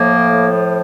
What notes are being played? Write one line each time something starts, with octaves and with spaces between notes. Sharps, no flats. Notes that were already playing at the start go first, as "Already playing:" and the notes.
Already playing: A2 F3 A#3